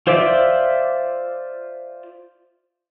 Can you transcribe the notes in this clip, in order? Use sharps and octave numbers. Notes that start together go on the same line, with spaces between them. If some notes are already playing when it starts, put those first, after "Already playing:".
F4 C5 D5 E5 D6